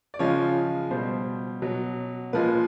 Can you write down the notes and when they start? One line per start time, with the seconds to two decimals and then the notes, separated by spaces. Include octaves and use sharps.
0.14 D5
0.19 C#3 F3 G#3 C#5
0.91 B2 G3 C5
1.62 B2 F#3
2.33 A#2 F3 G#3 B4